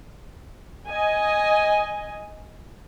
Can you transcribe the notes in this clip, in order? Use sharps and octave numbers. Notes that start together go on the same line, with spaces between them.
D#5 G#5